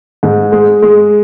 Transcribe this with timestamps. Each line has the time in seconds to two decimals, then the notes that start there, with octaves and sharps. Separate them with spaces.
0.23 G#2
0.52 G#3
0.82 G#3